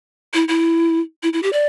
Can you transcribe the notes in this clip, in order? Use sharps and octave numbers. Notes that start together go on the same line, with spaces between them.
E4
E4
E4
E4
G4
D5